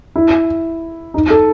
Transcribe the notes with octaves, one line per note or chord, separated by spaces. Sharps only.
E4
D#4
A4